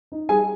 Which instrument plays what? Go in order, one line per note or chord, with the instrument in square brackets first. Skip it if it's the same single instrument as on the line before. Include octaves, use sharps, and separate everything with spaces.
[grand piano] D#4
G3 G#4 G#5